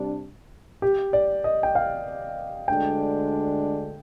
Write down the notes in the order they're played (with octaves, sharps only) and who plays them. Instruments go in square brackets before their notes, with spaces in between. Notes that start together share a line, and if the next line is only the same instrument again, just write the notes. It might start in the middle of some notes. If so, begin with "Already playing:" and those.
Already playing: [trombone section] C3 G3 D4
[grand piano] G4
D5
D#5
G5
F5
[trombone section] D2 D3 G#3 D4 [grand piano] G5